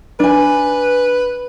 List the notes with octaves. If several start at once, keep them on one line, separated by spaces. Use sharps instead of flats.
D4 B4 G#5